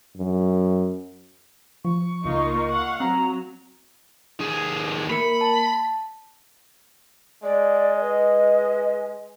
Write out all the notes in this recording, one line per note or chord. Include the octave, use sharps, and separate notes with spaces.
F#2
F3 C#6
C#2 A#3 D#4 F4
F5 F#5
F#3 C4 A#5
D#2 G#4
A#3 A#4 B5 C#7
A5
G#3 D5
B4 D#5